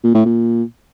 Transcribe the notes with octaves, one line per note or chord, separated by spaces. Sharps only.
A#2
A2
A#2